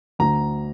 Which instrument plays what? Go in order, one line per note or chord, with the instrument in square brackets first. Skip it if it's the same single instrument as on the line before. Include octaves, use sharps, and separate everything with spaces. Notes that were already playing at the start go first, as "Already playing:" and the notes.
[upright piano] D2 A#5